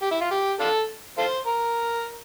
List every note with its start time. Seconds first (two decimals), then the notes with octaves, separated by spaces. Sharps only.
0.02 G4
0.11 E4
0.21 F4
0.31 G4
0.60 D4 F4 A4
1.18 F4 A4 C5
1.47 A#4